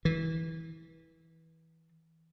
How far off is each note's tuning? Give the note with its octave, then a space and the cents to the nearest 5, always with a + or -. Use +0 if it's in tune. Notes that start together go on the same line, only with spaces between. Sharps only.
E3 -20